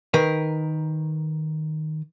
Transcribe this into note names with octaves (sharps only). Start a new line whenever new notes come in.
D#3 A#4 B4